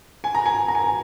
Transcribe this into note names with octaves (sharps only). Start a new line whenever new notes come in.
G#5
A#5
G#5
A#5
G#5